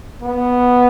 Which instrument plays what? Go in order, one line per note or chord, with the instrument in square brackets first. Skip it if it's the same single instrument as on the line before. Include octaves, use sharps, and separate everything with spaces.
[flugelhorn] B3